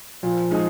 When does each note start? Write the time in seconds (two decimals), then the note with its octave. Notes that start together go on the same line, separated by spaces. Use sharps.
0.23 A#2 F3
0.51 G#3 D#4 G#4